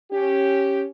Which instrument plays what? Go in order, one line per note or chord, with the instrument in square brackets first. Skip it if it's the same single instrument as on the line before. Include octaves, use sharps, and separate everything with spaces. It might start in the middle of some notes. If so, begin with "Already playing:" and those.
[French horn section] C#4 G4